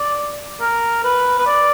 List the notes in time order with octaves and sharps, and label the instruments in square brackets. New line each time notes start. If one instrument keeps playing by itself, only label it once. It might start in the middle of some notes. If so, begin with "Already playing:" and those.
Already playing: [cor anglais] D5
A#4
B4
B4
D5